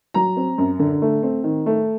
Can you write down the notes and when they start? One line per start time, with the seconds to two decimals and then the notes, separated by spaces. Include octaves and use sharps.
0.14 F#3 A#5
0.37 C4
0.58 F#2
0.79 D3
1.02 A3
1.23 C4
1.44 D#3
1.66 A3